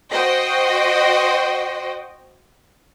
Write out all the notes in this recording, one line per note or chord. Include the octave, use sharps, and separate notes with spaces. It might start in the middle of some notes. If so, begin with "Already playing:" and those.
F#4 C5 D#5 G5